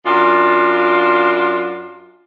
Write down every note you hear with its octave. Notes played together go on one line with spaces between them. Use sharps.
F#2 D4 F4